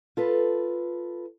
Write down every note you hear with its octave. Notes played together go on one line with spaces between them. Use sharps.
F4 A4 B4